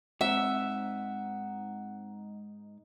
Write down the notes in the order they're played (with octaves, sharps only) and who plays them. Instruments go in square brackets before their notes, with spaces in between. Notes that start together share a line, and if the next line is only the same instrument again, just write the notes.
[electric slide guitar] G#2 D#4 [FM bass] C4 [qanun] E5 [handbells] F#5